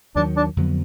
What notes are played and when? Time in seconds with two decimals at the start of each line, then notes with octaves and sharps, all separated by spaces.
0.15 D#2 D#3 F#3 D4
0.36 D4
0.57 F2 D3 F#3 B3